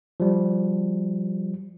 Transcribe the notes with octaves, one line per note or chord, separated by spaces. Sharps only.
F3 G3